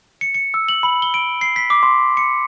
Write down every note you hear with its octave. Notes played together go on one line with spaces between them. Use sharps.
C#7
C#7
E6
F#7
B5
G7
D7
C7
B6
D6
C6
C#7